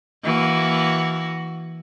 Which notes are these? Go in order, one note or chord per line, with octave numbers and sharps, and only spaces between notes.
E3 A#3 F#4